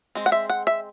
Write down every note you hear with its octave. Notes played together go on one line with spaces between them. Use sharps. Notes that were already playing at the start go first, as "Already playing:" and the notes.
G#3 C4
F#5
E5
F#5
E5